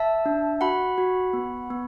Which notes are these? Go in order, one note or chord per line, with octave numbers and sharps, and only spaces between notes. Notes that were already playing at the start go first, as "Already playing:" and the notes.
Already playing: E5 A5
D4
F#4 F#5 B5
F#4
B3
B3